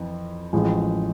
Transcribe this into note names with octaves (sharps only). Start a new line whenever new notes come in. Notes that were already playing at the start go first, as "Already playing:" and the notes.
Already playing: F2 E3
A1 A2 F3 G#3